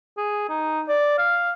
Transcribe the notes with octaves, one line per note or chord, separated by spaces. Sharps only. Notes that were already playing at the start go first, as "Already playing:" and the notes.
G#4
D#4
D5
F5